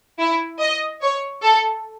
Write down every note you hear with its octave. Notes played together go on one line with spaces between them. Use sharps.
E4
D#5
C#5
A4